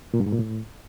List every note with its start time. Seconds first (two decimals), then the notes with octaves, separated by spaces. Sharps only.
0.14 A#2
0.20 G2
0.26 G#2
0.33 A#2
0.39 A2